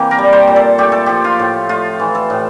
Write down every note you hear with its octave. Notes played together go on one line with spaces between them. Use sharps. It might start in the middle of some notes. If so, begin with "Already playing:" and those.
Already playing: C3 E3 A#3 G4
A#4
G3
C5
A#2
A4
A3 G4
A4
F3 G4
F4
A2
A3 F4
E3
A4
A2